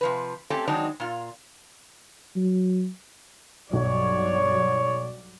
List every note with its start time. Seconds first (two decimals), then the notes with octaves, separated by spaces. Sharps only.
0.01 C3 F3 B4
0.50 A3 C4 C#4 G4 A4
0.68 D#3 F#3 G#3 C4 D4 D#4
1.00 A#2 F4
2.36 F#3
3.73 B1 G2 F#3 C#5 D5